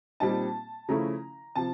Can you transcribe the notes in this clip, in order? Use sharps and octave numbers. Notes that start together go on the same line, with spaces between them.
A#2 G3 C4 D#4 A5
C#3 F3 A3 C#4 E4 A#5
C3 F3 A5